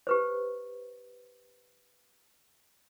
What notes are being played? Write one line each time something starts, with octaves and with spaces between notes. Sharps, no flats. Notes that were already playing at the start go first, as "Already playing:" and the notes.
G4 B4 C5